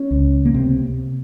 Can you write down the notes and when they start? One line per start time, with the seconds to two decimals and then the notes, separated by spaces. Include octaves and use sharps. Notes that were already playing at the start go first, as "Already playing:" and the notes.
Already playing: C#4
0.11 C#2
0.45 A#3
0.54 C3 C4